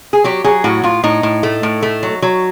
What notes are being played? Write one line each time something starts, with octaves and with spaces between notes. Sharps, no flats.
G#4
F#3 G4
F#3 G#4
A2 F#4
A2 F4
A2 D#4
A2
A3
A2
A3
F#3
F#3